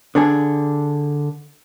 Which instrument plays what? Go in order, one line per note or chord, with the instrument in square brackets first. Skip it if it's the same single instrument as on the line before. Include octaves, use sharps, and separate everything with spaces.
[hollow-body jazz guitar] D3 D4 G#4